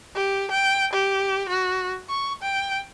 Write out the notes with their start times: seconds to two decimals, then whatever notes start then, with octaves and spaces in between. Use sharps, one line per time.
0.15 G4
0.51 G5
0.93 G4
1.49 F#4
2.09 C#6
2.42 G5